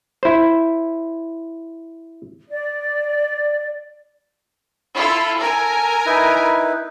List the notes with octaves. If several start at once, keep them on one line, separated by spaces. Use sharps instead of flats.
E4 C5
D5
E4 F4 A4
A4 A#4 G#5
D#4 E4 B4